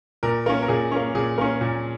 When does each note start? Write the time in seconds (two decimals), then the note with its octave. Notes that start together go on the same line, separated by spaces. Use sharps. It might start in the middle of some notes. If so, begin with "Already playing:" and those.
0.23 A#2 A#4
0.46 A#3 C#4
0.62 A#4
0.68 A#2 G#4
0.92 A#3 C#4
1.15 A#2 G#4
1.38 A#3 C#4
1.61 A#2